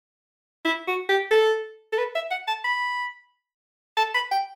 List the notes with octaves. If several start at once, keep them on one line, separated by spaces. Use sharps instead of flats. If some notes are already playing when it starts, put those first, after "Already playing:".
E4
F#4
G4
A4
A4
B4
E5
F#5
A5
B5
A5
B5
G5